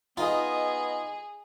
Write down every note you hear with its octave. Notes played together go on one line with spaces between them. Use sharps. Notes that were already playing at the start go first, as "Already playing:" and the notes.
B3 D#4 F4 G#4 D#5